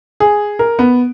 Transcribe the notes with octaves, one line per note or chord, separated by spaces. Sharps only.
G#4
A#4
B3